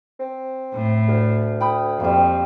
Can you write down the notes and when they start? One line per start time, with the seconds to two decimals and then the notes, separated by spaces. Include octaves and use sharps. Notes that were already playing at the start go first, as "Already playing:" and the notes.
0.20 C4
0.74 A2
1.08 D2
1.60 G5 B5 D#6
2.00 F2 G3 A#3